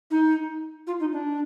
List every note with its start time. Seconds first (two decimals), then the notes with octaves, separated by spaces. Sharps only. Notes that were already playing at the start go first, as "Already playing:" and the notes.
0.11 D#4
0.87 F4
1.00 D#4
1.12 D4